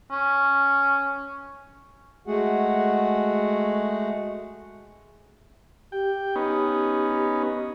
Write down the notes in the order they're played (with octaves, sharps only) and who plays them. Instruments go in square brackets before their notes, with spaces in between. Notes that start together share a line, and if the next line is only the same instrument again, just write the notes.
[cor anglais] C#4
[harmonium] G#3 A3 F#4 G#4 F#5
[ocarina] G4 [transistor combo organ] G5
[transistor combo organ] B3 C#4 D#4